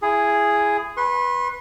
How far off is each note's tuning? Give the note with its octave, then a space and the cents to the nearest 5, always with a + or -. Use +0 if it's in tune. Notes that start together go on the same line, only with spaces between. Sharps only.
E4 +25 G#4 +0
B4 -5 C6 +45